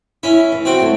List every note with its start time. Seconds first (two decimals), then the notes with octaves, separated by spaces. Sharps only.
0.23 C#4 E4 E5
0.52 E3
0.65 C4 F#4 G5
0.80 F#3 A3